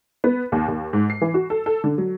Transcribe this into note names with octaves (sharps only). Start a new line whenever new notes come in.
B3
D#2
D#2
G#2
C7
E3
F#4
A4
A4
D3
F#3